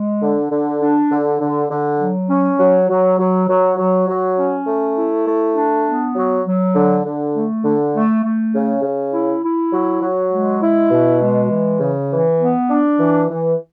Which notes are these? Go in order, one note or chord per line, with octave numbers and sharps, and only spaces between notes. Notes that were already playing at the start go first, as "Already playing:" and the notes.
Already playing: G#3
D3
D3
D4
D3
D3
D3
F#3
C#4
F#3
F#3
F#3
F#3
F#3
F#3
C#4
A3
E4
A3
D4
B3
F#3
F#3
D3
D3
A3
D3
A3
A3
C#3
C#3
E4
E4
F#3
F#3
G#3
E4
B2
G#3
E3
C#3
E3
B3
D4
E3
E3